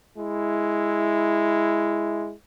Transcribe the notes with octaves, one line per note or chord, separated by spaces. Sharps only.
G#3 E4